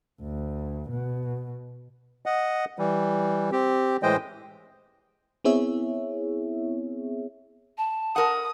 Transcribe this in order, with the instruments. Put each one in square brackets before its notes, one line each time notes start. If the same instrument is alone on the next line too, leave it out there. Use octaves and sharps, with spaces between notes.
[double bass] D2
B2
[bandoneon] D#5 F#5
E3 G3
C4 G4
A2 E3 G#3 C5 D#5 G5
[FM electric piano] B3 C4 E4 G#4 C#5 E5
[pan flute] A5
[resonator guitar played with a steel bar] A#4 F#5 [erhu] D#6